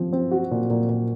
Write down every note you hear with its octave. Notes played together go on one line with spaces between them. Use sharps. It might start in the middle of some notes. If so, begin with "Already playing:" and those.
Already playing: F3 C4
C4
F#4
A#2
A#2
A#2